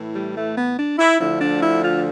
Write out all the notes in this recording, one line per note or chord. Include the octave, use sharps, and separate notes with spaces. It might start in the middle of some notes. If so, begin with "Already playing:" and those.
Already playing: A2 E3
G3
A3
B3
D4
E4
D2 D3 F3 E4
D4
E4
F4